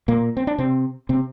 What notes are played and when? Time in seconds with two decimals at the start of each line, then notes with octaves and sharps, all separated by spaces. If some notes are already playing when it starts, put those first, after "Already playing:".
0.08 A#2 A#3
0.37 C4
0.47 D4
0.58 C3 C4
1.09 C3 C4